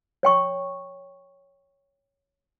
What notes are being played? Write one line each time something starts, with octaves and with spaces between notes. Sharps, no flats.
C#5 G5 C#6